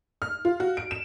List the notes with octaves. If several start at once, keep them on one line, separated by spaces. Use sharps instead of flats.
F6
F4
F#4
D7
E7